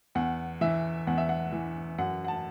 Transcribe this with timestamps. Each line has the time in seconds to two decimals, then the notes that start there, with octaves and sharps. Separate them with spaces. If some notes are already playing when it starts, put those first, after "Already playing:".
0.15 E2 F#5
0.61 E3 E5
1.07 E2 F#5
1.18 E5
1.29 F#5
1.52 E3
1.98 F#2 F#5
2.25 F#5
2.28 A5